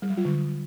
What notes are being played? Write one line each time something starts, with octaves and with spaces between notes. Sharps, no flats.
G3
F#3
F4
D3